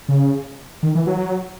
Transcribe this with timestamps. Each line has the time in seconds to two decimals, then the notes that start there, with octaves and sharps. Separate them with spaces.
0.08 C#3
0.83 D#3
0.95 E3
1.07 F#3